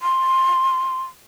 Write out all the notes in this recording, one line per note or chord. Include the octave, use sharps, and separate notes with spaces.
C6